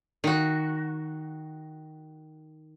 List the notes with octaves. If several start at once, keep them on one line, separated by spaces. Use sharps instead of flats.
D#3 F#4